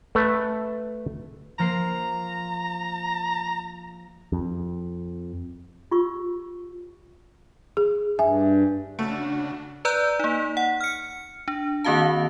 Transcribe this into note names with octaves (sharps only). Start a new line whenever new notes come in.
A3 A4 B4
F3 A#3 A#5 C7
F2
F4 G4 C#6 E6
G#4
G2 E5 G#5
C#3 A3 D4 F#4
B4 D5 A#5 E6 F#6 G6
A#3 D#4
F#5
F6 C#7
D4
D#3 A#3 C4 F#4 F5 A5